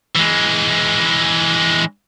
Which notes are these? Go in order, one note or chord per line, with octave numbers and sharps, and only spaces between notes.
E3 G#3